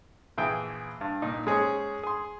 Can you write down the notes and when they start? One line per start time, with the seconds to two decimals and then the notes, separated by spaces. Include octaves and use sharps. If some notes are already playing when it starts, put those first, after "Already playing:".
0.38 A#1 E3 G#4 G5
1.01 G2
1.22 A#2 D#4
1.47 G#3 C#4 G#4 C5
2.03 G#4 C6